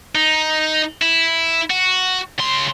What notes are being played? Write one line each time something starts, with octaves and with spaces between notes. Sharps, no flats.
D#4
E4
F#4
C#3 C6